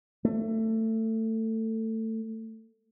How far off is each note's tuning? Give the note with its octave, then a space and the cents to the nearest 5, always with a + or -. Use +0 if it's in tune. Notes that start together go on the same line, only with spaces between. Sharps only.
A3 +20